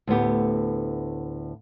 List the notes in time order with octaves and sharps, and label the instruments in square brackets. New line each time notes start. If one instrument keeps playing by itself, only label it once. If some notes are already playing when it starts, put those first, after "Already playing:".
[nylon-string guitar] D2 A2 B3 G4